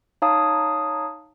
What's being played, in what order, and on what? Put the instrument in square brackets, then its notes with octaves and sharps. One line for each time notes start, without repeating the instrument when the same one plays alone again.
[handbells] D#4 C#5 F5 A5 D#6